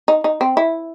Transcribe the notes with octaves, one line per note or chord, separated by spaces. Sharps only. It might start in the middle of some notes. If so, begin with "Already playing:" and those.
D#4
D#4
C4
E4